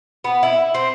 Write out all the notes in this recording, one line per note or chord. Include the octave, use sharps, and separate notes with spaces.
B3
E4
C4